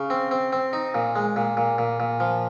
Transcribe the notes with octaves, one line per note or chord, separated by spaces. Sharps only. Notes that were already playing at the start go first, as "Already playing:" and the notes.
Already playing: C#3
C4
C4
C4
D#4
A#2
G#3
A#2
A#2
A#2
A#2
F3